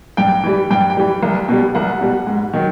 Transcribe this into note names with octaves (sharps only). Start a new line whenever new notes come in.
G2 G5
E3 G3
G2 G5
G5
E3 G3
C2
B2 G3
C2 F#5
B2 G3
G#2
D#3 F#3